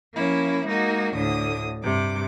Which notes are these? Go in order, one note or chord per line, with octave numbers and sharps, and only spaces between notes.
F3 A#3 C#4 E4
G#3 A#3 D#4 F#4
D2 A2 D3 D#6
G2 C3 D6